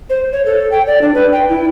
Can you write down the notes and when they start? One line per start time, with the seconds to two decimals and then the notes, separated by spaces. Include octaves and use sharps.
0.10 C5
0.32 C#5
0.46 A4
0.72 G5
0.87 D5
1.02 D4
1.14 B4
1.32 G5
1.49 E4